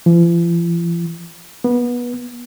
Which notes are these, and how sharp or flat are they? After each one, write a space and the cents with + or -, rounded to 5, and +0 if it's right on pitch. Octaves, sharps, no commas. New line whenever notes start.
F3 -45
B3 -25